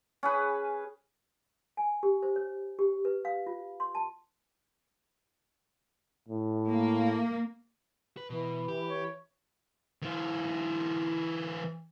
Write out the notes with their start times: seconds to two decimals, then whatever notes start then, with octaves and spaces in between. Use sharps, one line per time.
0.23 C#4 G#4 B4
1.77 G#5
2.03 G4
2.23 C5
2.36 C#5
2.79 G4
3.05 B4
3.25 F5
3.47 F4
3.80 C6
3.95 A5
6.28 A2
6.69 A#3
8.17 B4
8.30 B2 E3
8.68 G4
8.88 C#5
10.02 E3 F4